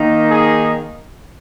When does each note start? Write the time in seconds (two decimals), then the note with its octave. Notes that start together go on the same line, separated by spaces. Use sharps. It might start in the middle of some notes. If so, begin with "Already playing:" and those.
Already playing: D#3 A#3 D#4
0.30 G#4